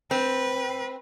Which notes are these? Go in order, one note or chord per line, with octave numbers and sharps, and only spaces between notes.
C4 B4